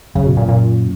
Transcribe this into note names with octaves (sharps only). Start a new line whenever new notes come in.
F#2 C#3
B2
A#2
A#2